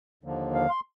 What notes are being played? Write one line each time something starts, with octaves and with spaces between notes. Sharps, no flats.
D#2 D3 F3 A#3
F5
C6